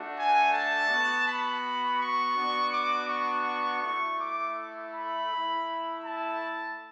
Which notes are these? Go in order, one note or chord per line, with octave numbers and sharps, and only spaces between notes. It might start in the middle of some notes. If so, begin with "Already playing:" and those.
Already playing: A3 D4 F#4
G#5
A5
B3 F#4
B5
C#6
B3 D4 F#4
D6
C#6
A3 E4 C#6
D6
B5
A3 E4
A5